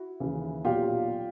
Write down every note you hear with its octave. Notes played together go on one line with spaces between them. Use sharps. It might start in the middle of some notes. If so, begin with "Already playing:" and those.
Already playing: E4 F#4
D#2 C#3 E3
B1 A#2 F#3 F4 G4